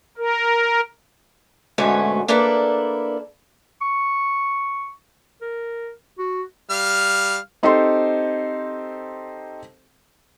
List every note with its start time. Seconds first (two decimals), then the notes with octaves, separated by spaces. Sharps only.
0.18 A#4
1.78 D2 G#2 B2 A3 C#4 C#5
2.28 A#3 D4 E4 A4 B4
3.82 C#6
5.42 A#4
6.18 F#4
6.70 G3 F5 F6
7.63 C4 D#4 G4 A4 C5 C6